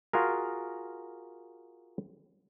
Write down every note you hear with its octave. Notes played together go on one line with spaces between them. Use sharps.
F4 F#4 G#4 A#4